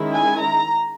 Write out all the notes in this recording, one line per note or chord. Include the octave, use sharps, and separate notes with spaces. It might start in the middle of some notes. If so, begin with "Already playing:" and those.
Already playing: D#3 G#3 C#4 E4
G#5
A#5